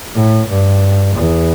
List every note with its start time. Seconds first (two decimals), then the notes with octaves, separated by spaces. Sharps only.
0.15 A2
0.48 G2
1.15 E2